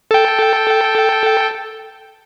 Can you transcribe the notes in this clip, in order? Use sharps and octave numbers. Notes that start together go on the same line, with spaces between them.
A4 G5